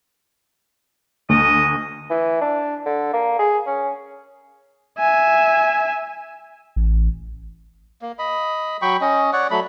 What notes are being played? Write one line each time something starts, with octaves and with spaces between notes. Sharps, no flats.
D2 D#5
E3
D4
D3
A#3
G#4
C#4
E5 G#5
A1
A#3
D#5 B5
F#3 G5 B5 C#6
C#4 D#5
C#5 D5 F#5
F#3 A3 B5